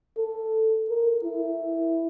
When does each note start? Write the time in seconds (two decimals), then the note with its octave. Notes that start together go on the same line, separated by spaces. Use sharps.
0.18 A4
0.89 A#4
1.23 E4